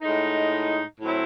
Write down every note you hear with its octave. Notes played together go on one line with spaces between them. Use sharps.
A2 G#3 D#4
A2 F#3 C4 E4